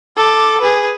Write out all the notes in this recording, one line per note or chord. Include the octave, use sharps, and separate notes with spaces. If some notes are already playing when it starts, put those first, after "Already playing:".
A4 D6
G#4 B4